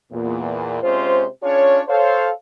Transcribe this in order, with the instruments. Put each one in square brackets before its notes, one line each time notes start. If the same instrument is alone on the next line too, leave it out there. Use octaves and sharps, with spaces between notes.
[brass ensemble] E2 A#2
C3 G#3 C#4 F4 C5
C#4 D4 F4 G#4 C#5
A4 C5 C#5 F5